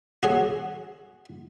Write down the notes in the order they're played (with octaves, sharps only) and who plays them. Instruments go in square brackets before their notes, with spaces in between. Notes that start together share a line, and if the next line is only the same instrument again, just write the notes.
[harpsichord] F#4 G#4 C#5